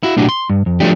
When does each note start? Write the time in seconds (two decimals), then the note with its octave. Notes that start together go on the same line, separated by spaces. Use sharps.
0.03 E4 F#4
0.17 B1 A2 D4 F#4 G4
0.29 C6
0.50 G2
0.66 F2
0.80 F3 F#3 A3 D4 G4